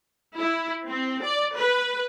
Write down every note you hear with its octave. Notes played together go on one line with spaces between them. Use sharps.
E4
C4
D5
B4